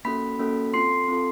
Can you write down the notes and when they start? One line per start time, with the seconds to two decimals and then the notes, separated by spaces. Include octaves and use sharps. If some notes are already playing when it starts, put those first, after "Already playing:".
0.05 A#3 C#4 F#4 A4 B5 B6
0.39 A#3 C#4 F#4 A4
0.74 C4 F4 A4 C6 C7
1.08 C4 F4 A4